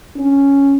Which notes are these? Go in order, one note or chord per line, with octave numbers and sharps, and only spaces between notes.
C#4